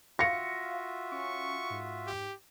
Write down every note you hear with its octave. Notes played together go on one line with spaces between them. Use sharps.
F4 F#4 E5 F5 A#6 C#7
C#4 C#6
G#2
G4